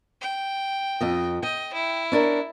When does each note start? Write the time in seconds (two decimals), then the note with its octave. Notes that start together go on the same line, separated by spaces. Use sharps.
0.21 G5
1.01 F2 D#5
1.43 D#5 G5
1.74 E4
2.12 C#4 D4 A#4